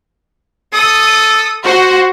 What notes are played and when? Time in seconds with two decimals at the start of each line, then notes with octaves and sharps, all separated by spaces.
0.74 A4 D#6
1.64 F#4 C5 F#5